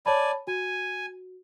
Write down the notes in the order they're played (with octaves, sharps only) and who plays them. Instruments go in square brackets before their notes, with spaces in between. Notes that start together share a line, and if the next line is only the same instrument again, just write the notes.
[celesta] C#5 A5 B5 [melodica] D5 G#5
[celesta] F#4 [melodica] G#5